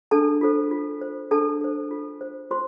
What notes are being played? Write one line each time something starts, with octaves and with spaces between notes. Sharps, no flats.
D4 A4 A5
F4 A4 C5
F4
C5
D4 A4 A5
A4 C5
F4
C5
F4 C5 C6